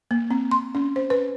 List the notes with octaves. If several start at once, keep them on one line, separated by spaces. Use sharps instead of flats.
A#3
C4
C6
C#4
C5
B4